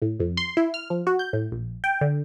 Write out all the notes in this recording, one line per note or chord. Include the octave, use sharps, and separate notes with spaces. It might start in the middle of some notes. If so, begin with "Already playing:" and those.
A2
F2
C6
E4
F6
F3
F#4
G6
A2
A#1
G5
D3